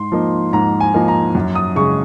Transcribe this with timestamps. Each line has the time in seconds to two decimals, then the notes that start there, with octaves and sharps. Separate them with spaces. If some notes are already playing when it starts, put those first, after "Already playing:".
Already playing: G#2 C6
0.12 F3 A#3 D#4
0.53 G#2 A#5
0.80 G#5
0.94 F3 A#3 D#4
1.08 A#5
1.35 F#2
1.55 D#6
1.76 C#3 G#3 C#6